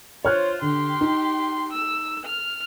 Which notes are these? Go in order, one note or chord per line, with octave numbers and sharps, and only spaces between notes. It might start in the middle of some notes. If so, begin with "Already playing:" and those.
F4 C5 C#5 F6 F#6
D3 G4 C6
D#4
E6
F6